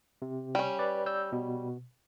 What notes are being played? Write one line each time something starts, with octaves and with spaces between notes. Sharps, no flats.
C3
G3 C#4
B4 D5
D5 E6 G6
B2